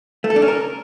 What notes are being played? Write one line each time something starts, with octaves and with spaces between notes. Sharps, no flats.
A3
A4
D4
C#4
A#4